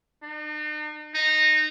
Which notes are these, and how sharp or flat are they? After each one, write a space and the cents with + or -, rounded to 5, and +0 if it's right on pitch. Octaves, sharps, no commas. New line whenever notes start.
D#4 -45
D#4 -15